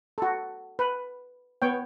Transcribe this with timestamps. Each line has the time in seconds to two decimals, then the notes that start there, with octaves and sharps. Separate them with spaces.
0.18 F#4 A4
0.79 B4
1.62 B3 C#5 G5